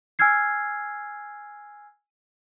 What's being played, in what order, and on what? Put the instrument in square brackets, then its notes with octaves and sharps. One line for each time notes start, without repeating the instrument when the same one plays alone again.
[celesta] G#5 E6 F6 G#6 C7